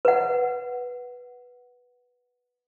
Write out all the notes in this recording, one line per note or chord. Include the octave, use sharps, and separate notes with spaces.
B4 F#5